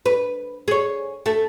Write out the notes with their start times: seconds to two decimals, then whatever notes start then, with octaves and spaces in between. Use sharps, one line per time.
0.06 B4
0.68 G#4 C#5
1.26 A3